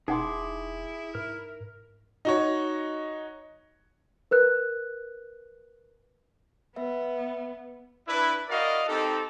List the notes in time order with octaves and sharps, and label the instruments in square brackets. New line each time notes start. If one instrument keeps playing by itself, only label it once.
[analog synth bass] E1 [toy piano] D#4 F#5 C6 [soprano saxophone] E4 [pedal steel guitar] G#4 D6
[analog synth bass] G#2 [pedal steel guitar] A#4
[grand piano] D#4 F#4 C#5
[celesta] A#4 B4 F#6
[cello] B3 [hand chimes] B4 E5
[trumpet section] D4 E4 B4
E4 F#4 A#4 D5 D#5 F5
C4 D#4 G4 A4